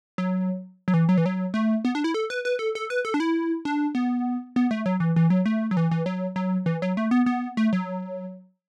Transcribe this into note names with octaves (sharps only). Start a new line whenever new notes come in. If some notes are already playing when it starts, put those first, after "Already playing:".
F#3
F#3
E3
F#3
E3
F#3
A3
B3
D4
E4
A4
B4
B4
A4
A4
B4
A4
D4
E4
D4
B3
B3
A3
F#3
E3
E3
F#3
A3
F#3
E3
E3
F#3
F#3
E3
F#3
A3
B3
B3
A3
F#3